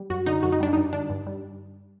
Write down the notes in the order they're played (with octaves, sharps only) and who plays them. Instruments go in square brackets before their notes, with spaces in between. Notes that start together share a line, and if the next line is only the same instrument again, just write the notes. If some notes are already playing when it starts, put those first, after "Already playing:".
Already playing: [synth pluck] G3
F#2 F#4
D3 D#4
F#2 F#4
D#4
G3 D4
D#4
G2
D3 D4
G2
G3